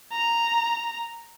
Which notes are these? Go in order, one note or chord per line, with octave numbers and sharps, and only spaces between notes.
A#5